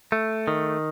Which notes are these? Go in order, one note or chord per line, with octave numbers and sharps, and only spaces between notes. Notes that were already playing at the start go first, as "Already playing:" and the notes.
A3
D#3